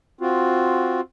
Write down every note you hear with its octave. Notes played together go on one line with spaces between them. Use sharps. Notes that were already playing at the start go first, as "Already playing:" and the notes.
C4 F4 F#4